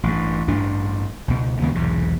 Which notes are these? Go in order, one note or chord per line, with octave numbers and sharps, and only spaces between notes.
A1 G2
A1 G2 D4
C#2 B2
D#2 C#3 G#3 B3
B1 E2 G#2 C3